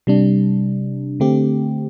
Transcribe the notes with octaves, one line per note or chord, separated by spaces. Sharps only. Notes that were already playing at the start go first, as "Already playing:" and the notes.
C3 G3 D4
D3 A3 C4 G4